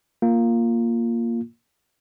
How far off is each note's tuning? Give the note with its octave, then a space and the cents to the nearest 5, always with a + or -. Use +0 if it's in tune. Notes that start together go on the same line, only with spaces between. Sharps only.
A#3 +0 F4 +0